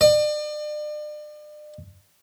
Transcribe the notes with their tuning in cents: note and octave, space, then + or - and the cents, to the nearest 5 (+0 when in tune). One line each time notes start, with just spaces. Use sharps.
D5 +40